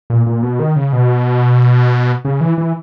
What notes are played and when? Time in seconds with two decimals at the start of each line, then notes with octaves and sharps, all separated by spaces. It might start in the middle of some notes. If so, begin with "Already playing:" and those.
0.10 A#2
0.27 A#2
0.43 B2
0.60 D#3
0.76 C#3
0.93 B2
2.25 C#3
2.41 E3
2.58 E3